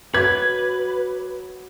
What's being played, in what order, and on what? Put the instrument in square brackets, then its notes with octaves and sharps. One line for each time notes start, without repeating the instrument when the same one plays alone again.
[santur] F#3 D6 [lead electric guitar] B4 [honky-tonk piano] G#6